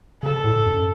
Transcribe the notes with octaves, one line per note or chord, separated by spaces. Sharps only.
C#3 A4
A2
F#2